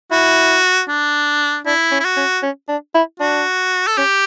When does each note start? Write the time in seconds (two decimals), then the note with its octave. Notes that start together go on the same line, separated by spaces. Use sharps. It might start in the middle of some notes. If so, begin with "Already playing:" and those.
0.11 E4 F#4
0.88 D4
1.66 D4 E4
1.92 C#4
2.00 E4
2.04 F#4
2.17 C#4
2.43 C#4
2.69 D4
2.94 E4
3.20 D4 F#4
3.87 A4
3.97 C#4 G4